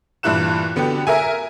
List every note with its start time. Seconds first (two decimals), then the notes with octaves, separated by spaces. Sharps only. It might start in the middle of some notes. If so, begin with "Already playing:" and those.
0.23 G2 A#2 E3 E4 F#6 E7
0.76 D3 B3 F#4 G4
1.07 A#4 E5 G#5